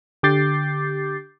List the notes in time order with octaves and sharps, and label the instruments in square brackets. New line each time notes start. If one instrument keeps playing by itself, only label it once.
[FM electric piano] D3 G4 D6 G6 A6 C7